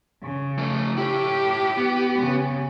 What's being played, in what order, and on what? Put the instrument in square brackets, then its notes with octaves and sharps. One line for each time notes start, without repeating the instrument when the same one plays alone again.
[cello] C#3
[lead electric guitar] F3 A3
[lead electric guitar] E4 C#5 [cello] G4
[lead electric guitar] B3
[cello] C#3